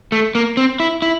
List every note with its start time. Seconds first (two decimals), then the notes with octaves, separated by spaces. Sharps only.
0.12 A3
0.35 A#3
0.57 C4
0.80 E4
1.02 E4